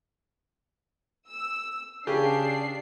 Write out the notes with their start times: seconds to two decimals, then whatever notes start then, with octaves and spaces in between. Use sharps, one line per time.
1.29 E6
2.07 C#3 D4 G4 G#4 C7